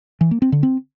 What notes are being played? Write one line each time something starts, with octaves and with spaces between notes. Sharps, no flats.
E3
A#3
C4
D3
C4